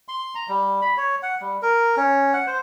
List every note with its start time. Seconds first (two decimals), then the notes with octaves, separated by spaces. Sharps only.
0.08 C6
0.35 A#5
0.48 G3
0.82 B5
0.97 C#5
1.23 F#5
1.41 G3
1.62 A#4
1.97 C#4
2.33 F#5
2.47 C5